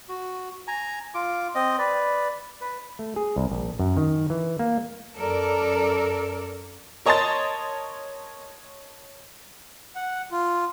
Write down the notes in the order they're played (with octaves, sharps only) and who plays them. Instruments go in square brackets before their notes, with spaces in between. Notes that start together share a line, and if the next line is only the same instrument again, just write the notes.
[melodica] F#4
G#5 A#5
F4 D6
C4 D#5
B4 D5
B4
[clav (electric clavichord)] A3
G#4
C2
A#1
F#2
D#3
E3
A#3
[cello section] F#2 A4 A#4 D5
[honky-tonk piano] A#4 C#5 D#5 A5 C6 A6
[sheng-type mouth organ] F#5
F4